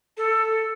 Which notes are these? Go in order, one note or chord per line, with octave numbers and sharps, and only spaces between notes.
A4